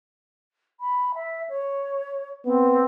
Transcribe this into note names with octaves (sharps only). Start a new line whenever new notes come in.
B5
E5
C#5
B3 C4